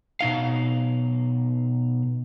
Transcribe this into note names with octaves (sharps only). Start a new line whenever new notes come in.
B2 D#4 F5